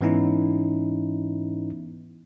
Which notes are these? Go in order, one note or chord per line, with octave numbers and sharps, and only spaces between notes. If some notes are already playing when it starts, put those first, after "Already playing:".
G#2 E3 B3 C#4 D#4 E4